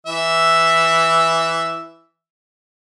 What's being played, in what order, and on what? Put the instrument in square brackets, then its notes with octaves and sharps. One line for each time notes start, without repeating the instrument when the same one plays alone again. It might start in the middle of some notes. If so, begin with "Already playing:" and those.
[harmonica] E3 E5